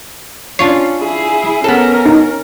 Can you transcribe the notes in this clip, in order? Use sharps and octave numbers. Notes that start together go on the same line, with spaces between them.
C#4 D4 F4 C#5 C7
E4 G#4
B3 C#4 A4 A#4
D#4